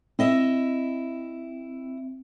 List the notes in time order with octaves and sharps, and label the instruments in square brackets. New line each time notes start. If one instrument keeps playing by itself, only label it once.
[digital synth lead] C4 [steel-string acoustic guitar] E4 D#5 E5